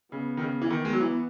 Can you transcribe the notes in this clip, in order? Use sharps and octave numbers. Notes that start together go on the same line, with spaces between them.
C#3 B3
D#3
C#3
E3
D#3
G#3
F#3
E3